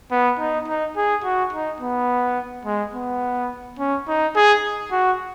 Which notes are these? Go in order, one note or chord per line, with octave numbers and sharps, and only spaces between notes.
B3
D#4
D#4
G#4
F#4
D#4
B3
G#3
B3
C#4
D#4
G#4
F#4